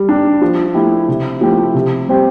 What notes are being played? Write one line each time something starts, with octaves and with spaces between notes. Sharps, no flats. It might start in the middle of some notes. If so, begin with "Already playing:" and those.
Already playing: G3
D4 G4
F3
A3 E4 G4
C3
F3 A3 E4 G4
C3
G3 C4 G4